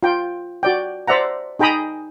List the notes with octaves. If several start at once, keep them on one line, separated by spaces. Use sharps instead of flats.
F4 G5
F#4 D5 G5
C5 D5 E5 F#5 A#5
D#4 G#4 G5 A#5 B5 D#6